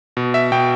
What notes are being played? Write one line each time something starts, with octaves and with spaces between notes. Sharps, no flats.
B2
E5
B2 G5